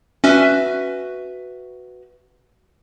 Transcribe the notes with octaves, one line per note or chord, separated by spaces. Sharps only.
C#4 F#4 B4 E5